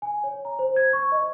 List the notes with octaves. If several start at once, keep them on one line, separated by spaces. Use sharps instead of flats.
G#5
C#5
A#5
C5
G#6
C#6
D#5